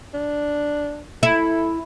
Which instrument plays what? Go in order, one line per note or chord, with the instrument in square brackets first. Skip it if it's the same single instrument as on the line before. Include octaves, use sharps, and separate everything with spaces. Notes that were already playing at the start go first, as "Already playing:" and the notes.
[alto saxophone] D4
[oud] E4 [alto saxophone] A4